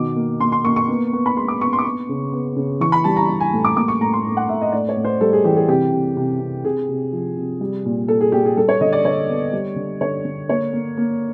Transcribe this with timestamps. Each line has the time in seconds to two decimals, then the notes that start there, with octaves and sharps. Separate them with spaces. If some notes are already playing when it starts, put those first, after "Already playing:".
Already playing: B2 D#3 D6
0.16 A#3
0.40 A#3 C6
0.52 C6
0.65 A#3 C#6
0.76 C#6
0.88 B3
1.13 B3
1.26 B5
1.36 G#3 C6
1.48 D6
1.61 B3 C#6
1.73 C6
1.79 D6
1.85 B3 C#6
2.09 C#3
2.33 B3
2.56 C#3
2.80 E3 C#6
2.92 B5
3.04 G3 A5
3.16 A#5
3.29 G3
3.40 G#5
3.53 A2
3.65 D6
3.76 A#3 D6
3.88 C#6
4.01 A2 A#5
4.13 C6
4.25 A2
4.37 F#5
4.49 A2 E5
4.61 D#5
4.72 A2 D5
4.89 C#5
4.97 A2
5.04 C5
5.21 G3 A4
5.33 G#4
5.44 E3 G4
5.57 G#4
5.68 C3 G4
5.92 C3
6.17 C3
6.40 C3
6.64 C3 G#4
6.89 C3
7.13 F3
7.37 C3
7.61 G3
7.85 A#2
8.08 A#2 A4
8.21 G#4
8.32 A#2 G4
8.45 G#4
8.57 G3 A4
8.69 C#5
8.81 D3 D#5
8.93 D5
9.05 D3 C#5
9.29 B3
9.53 G3
9.76 D3
10.01 D3 C#5
10.25 D3
10.49 A#3 C#5
10.73 A#3
10.97 A#3